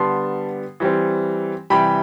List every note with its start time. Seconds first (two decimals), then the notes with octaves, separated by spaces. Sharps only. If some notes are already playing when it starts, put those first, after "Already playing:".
Already playing: D3 G3 B3 A5 C6
0.80 E3 G3 C4
1.70 C3 E3 G3 G5 B5